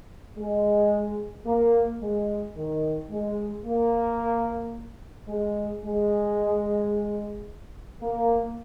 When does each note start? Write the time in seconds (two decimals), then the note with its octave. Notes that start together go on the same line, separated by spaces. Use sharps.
0.37 G#3
1.46 A#3
2.00 G#3
2.56 D#3
3.10 G#3
3.64 A#3
5.28 G#3
5.83 G#3
8.02 A#3